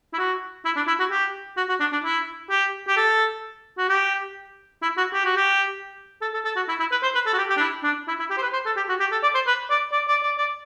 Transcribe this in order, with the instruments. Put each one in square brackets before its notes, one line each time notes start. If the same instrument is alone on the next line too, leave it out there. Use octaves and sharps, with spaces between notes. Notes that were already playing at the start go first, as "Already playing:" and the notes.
[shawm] E4
F#4
E4
D4
E4
F#4
G4
F#4
F#4
D4
D4
E4
G4
G4
A4
F#4
G4
E4
F#4
G4
F#4
G4
A4
A4
A4
F#4
E4
E4
B4
C5
B4
A4
F#4
G4
G4
D4
E4
D4
E4
E4
G4
C5
B4
C5
A4
G4
F#4
G4
A4
D5
C5
B4
D5
D5
D5
D5
D5